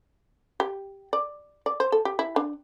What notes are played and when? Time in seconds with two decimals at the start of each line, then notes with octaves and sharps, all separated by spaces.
0.60 G4
1.13 D5
1.66 D5
1.80 C5
1.92 A4
2.05 G4
2.19 E4
2.36 D4